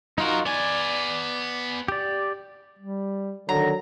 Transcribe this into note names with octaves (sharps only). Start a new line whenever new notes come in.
F#3 D#4 F4 F#4 A#4
B3 D5 G#5
G4 D5
G3
D3 D#3 F#3 A#5